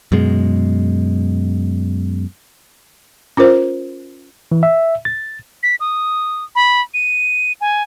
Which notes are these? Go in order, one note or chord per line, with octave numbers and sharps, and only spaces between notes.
F#2 B2 G#3
C#4 F4 A#4 C5
E3
E5
A6
B6
D#6
B5
D#7
G#5